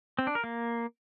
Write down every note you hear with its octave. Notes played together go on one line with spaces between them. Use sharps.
C4
D4
A#4
A#3